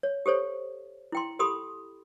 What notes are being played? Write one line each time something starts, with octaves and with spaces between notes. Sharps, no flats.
C#5
G4 A4 C5 C#5
E4 G5 C6
G4 A4 B5 C6 D#6